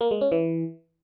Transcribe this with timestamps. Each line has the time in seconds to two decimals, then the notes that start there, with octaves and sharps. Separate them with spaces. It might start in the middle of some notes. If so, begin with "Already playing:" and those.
0.01 A#3
0.11 G#3
0.21 C#4
0.32 E3